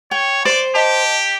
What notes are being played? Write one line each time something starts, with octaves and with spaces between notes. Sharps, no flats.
C#5 G5
C5 D5 C6
G4 D#5 A5